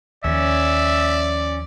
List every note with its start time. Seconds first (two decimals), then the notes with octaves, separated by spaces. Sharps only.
0.24 D#2 F3 C#4 D5 E5